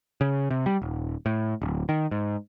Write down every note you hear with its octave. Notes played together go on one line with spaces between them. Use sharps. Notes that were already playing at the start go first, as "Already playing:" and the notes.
C#3
C3
G3
D#1
A2
D1
D#3
G#2